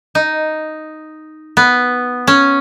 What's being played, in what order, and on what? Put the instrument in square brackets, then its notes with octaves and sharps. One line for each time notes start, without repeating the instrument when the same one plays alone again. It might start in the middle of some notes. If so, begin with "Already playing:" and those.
[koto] D#4
B3
C#4